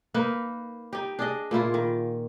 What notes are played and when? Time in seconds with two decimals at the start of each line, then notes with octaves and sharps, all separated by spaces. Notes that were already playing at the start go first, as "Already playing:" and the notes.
0.14 A#3 D#4 B4
0.93 D#4 G4
1.19 D4 G#4 D#5
1.51 A#2 A#3 E4 F4
1.74 D#3